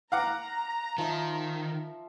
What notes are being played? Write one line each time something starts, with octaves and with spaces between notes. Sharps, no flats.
F5 F#5 A#5 D6
D#3 F3 E5